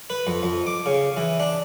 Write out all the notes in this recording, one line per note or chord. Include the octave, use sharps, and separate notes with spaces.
B4
F2
F2
D6
C#3
E3
D4